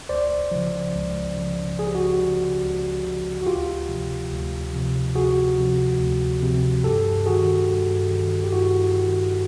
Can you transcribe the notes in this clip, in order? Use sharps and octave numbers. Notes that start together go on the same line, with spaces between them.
C#2 C5 D5
C#3 F3
C#2
C#3 F3
C#2 G#4
G4
F#4 G#4
C#3 F3
C#2
C#3 F3
F#4
D2 F4 G4
C3 F3
D2
C3 F3
D2 F#4 G#4
C3 F3
D2
C3 F3
G2 G4 A4
D#3 F#4 G#4
G2
D#3
G4
G2 E4 F#4
D#3